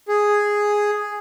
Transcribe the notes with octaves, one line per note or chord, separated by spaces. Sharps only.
G#4